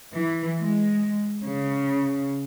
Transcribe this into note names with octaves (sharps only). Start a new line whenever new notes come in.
E3
G#3
C#3